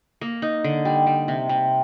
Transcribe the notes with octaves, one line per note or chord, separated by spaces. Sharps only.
A#3
D#4
D3
G3
G3
C3
C3